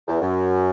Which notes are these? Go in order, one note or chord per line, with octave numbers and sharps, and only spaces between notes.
E2
F#2